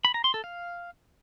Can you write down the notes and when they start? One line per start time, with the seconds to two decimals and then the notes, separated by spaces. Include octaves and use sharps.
0.05 B5
0.14 A#5
0.24 C6
0.34 A4
0.44 F5